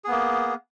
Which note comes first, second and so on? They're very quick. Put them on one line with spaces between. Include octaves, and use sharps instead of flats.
G#4 B3 A#3